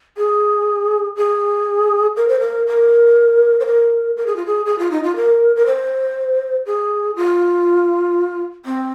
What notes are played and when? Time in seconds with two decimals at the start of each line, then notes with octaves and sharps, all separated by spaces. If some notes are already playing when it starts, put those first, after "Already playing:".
0.17 G#4
1.17 G#4
2.17 A#4
2.28 C5
2.40 A#4
2.67 A#4
3.60 C5
3.66 A#4
4.17 A#4
4.26 G#4
4.36 F4
4.46 G#4
4.66 G#4
4.79 F4
4.91 D#4
5.03 F4
5.16 A#4
5.56 A#4
5.66 C5
6.66 G#4
7.16 F4
8.66 C4